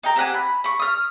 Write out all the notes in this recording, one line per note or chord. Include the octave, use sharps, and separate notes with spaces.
D#4 G5 A#5
C4 G4 F#5 G#5
B5
B5 C#6
D#6 F6